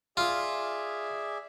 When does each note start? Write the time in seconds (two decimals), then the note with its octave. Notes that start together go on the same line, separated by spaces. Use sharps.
0.17 F4 G#4 D5 E5